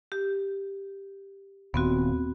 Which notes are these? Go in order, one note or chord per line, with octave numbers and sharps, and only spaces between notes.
G4
D#1 D#2 B3 C4 F#4